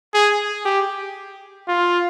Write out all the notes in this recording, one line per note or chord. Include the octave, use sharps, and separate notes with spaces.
G#4
G4
F4